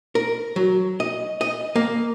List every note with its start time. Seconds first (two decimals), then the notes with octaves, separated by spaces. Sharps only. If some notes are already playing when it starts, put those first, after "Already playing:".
0.15 A#4
0.56 F#3
1.00 D#5
1.41 D#5
1.76 A#3